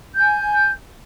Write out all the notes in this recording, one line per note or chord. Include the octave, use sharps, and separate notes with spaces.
G#5 G6